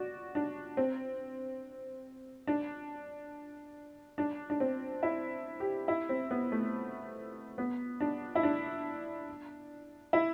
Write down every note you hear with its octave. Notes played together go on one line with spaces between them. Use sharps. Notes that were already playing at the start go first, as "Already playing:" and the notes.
Already playing: F#4 D5
D4
C4
D4
D4
D4
C4
E4
G4
E4
C4
B3
A3
B3
D4
E4
D4
E4